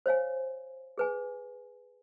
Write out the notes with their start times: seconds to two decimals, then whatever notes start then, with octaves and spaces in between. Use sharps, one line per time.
0.06 C5 C#5 F5 G#5
0.98 G#4 B4 G#5